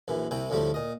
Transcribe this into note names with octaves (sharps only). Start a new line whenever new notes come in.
A#1 F#2 E3
C2 C3 E4 G5
D2 A2 F3 G3 A3
A#2 D#5